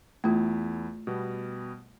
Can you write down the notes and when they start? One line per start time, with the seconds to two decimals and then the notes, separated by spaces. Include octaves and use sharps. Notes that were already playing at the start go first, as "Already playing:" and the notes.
0.24 E2 A3 E4 F4
1.07 B2 G3 B3